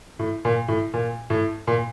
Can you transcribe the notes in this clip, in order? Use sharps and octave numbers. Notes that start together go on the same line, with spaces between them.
A2
A#2
A2
A#2
A2
A#2